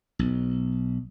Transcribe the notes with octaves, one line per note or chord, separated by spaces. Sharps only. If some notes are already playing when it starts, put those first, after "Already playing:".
B1